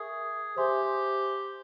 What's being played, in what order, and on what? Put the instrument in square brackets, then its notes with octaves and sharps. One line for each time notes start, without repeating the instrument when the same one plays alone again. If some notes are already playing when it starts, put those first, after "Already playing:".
Already playing: [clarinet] G#4 [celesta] A#4 E5 G#5 C#6
[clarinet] G4 [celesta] C5 E5 G#5 C6